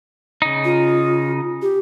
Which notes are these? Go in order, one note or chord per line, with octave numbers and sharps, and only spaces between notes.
C#3 D#4
F4
G4